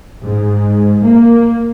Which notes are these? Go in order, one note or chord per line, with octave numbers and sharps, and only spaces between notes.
G#2
A#3